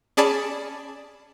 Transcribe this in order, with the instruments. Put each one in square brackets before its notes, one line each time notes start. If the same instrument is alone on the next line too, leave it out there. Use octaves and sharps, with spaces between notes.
[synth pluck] C#4 G#4 D5 G#5 A5 B5